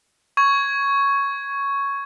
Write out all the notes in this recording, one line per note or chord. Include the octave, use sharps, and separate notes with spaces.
C#6 G#6